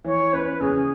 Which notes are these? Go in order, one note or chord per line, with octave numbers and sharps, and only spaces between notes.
E3 C#5
C#4 B4
C#3 G#4